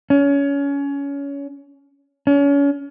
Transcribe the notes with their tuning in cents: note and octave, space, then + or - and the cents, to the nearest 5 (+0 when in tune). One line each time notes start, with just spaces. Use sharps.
C#4 +25
C#4 +35